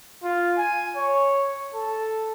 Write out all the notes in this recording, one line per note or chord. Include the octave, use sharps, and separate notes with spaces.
F4
G#5
C#5
A4